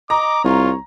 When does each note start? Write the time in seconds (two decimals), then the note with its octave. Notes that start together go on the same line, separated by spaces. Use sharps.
0.10 D#5 A#5 D6
0.45 C2 F4 C#5